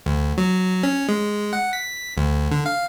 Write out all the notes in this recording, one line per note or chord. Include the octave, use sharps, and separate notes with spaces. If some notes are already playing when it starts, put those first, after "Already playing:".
D2
F#3
C#4
G#3
F#5
B6
D2
D3
F5